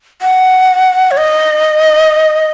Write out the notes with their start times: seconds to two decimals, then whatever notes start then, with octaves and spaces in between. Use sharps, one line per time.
0.22 F#5
1.11 C#5
1.17 D#5